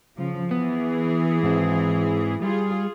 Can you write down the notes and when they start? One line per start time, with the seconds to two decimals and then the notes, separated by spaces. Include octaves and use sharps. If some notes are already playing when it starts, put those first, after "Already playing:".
0.17 C#3 F3
0.51 E3 B3 G#4
1.43 G#2 C4
2.42 G3 F4 G#4